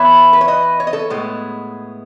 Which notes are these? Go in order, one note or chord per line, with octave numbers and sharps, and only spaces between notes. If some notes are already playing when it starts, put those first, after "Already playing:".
Already playing: E3 B3 E4 C#5 E5
B4
C#5
B4 D#5
C#5
D#5
A4 C#5
A2 G#3 B3